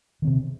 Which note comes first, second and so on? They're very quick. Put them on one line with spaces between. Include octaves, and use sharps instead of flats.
D#3 C4 C3